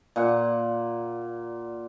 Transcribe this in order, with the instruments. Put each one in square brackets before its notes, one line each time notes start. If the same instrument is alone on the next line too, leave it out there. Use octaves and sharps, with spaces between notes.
[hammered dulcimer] A#2 A#3 F#5